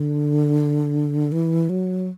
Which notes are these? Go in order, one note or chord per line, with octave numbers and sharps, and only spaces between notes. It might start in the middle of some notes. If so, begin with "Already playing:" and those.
Already playing: D3
E3
F#3